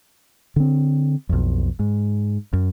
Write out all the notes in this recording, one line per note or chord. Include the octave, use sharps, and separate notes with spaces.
D3 C4
B1 F2
G#2
F#2